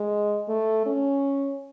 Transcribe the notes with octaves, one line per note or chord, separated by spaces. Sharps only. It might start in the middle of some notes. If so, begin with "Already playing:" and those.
Already playing: G#3
A3
C#4